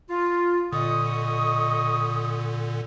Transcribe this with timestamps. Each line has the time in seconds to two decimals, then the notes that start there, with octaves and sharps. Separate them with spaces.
0.09 F4
0.72 A#2 D3 D#5 C#6 D#6